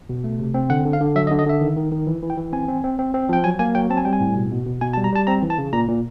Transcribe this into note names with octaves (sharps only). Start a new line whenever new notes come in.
B2
A3
C3
C4
D3 F#5
D3
F5
D3
F#3 E5
D#5
D3
D#5
D3 E5
D#3
D#3
D#3
E3
E3
G5
E3
C4 G#5
C4
C4
C4
C4
F3 G5
F#3 G#5
A#3 G#5
F#3 G5
C4 A5
G#5
G3 G5
G#5
A2
B2
B2
B2
B2 G#5
A5
G3
A#5
G3 A5
C4 A#5
E3
A5
C#3
A#2 A#5
A#2